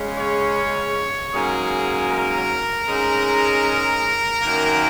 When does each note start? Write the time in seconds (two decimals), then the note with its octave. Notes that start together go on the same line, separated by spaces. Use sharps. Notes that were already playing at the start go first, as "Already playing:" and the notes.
Already playing: C#3 G#3 C#4
0.18 C#5
1.34 G#2 F#3 A#3 C#4 G#4
2.11 A#4
2.88 G#2 G#3 C#4
4.43 F#2 D#3 A#3